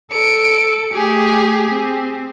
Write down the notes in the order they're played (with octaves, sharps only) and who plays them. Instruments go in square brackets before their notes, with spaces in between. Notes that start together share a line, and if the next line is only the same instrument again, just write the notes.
[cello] A4 [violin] C#7 D7
[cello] A3 G4 [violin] G#4
[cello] C4